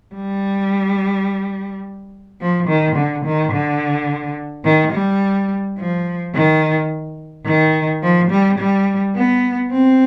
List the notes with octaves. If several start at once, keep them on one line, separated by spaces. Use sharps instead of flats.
G3
F3
D#3
D3
D#3
D3
D#3
G3
F3
D#3
D#3
F3
G3
G3
B3
C4